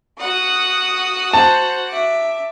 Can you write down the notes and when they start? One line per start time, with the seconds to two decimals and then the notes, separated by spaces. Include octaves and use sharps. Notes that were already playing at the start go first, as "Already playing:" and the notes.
0.20 F#4 F#5 D#6
1.33 C5 A5
1.90 E5 D6